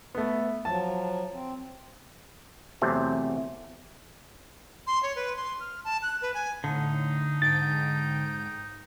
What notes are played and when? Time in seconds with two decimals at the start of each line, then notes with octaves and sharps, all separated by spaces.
0.15 A3 B3
0.65 F3 F#3 A5
1.34 C4
2.82 E2 C3 F#3 A3 C4
4.87 C6
5.03 C#5
5.16 B4
5.37 C6
5.60 F6
5.84 A5
6.02 F#6
6.22 B4
6.34 G#5
6.64 A2 D3 D#4
7.42 G#2 G5 A6 D7